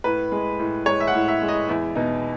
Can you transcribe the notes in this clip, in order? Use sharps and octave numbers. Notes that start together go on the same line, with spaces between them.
A2 B4
G#3
A2
G#3 C#5
E5
F#5
A2
E5
G#3
D#5
E2 E4
B2 D#4